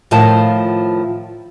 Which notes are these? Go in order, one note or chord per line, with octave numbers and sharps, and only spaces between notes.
A2 D#3 F3 F4 C5 A5